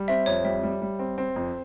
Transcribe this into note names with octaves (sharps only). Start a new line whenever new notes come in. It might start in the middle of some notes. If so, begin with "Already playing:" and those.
Already playing: G3
C4 E5
F2 C#5
G3 E5
G3
G3
C4
C4
F2